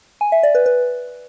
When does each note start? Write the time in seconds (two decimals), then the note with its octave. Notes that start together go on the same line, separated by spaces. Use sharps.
0.21 G#5
0.32 E5
0.43 D5
0.55 B4
0.66 B4